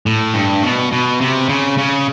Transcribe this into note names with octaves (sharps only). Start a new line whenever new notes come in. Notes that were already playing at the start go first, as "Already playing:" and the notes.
A2
G2
B2
B2
C3
C#3
C#3